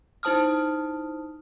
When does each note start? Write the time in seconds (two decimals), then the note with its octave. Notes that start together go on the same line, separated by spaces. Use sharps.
0.23 D#4 E4 C5 A5 D#6 F6